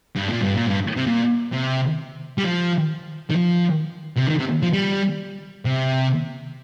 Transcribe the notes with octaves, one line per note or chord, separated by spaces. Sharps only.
G2
A#2
G2
A#2
G2
C3
A#2
C3
G3
F3
D#3
F3
C3
D#3
C3
F3
G3
C3